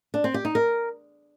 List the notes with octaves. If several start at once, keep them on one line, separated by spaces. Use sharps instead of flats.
D4
C4
G4
D#4
A#4